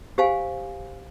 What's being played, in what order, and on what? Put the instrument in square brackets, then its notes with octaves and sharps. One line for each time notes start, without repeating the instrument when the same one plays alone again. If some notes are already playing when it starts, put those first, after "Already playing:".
[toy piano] G4 C5 F5 G#5